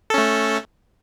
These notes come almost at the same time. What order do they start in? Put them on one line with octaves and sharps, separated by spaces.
A4 C#4 A3